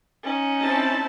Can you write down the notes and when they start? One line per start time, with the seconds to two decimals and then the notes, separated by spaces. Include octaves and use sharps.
0.23 C#4 D#4
0.61 C4 E4 A5